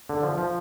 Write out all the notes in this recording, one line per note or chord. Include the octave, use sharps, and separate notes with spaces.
D3
F3
F3